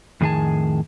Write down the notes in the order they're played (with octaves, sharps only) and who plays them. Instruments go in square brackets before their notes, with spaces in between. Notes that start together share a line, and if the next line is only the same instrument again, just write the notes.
[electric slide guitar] F2 A2 D#3 G#4 G#5 A5